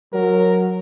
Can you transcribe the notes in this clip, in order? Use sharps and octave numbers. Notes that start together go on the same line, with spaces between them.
F#3 A#4